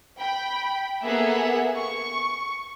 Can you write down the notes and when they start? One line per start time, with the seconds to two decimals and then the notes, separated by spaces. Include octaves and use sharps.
0.19 G5 B5
1.04 A#3 B3 G#4 A4 E5 F#5
1.75 C#6